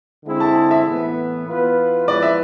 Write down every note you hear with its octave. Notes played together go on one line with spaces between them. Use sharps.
D3 G#3 C4 E4 G#4
A5
A5
E5
A2 E3 B3
E3 B3 F4 B4
F3 G#3 B3 E4 B4 D5
E5